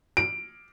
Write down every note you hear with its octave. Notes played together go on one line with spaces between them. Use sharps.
D7